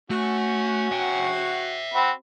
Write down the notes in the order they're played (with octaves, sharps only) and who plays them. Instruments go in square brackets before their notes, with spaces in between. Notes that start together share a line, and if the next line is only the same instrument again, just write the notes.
[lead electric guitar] A3 [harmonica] C#4 [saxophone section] F#4
[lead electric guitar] E5 G5
[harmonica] C4 F#4 B5